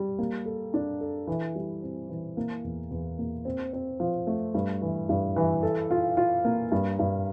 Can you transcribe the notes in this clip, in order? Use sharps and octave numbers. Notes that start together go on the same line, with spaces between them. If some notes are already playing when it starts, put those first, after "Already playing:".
Already playing: G3
A#3
A4
D4
A4
E3
G3
C4
E3
A#3
E2
E2
A#3
C4
C4
F3
A3
G2
E3
G2
E3
A4
F4
F4
A#3
G2
G2